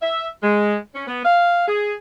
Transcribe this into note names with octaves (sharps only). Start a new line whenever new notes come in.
E5
G#3
C#4
B3
F5
G#4